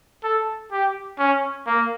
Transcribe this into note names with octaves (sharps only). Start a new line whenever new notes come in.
A4
G4
C#4
A#3